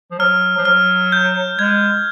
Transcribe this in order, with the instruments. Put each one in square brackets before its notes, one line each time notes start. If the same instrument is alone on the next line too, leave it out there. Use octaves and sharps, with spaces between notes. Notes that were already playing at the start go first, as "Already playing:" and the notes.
[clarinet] F3
[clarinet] F#3 [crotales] F6
[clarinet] F3
[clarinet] F#3 [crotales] F6
[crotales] G6
[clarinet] G#3 [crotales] G#6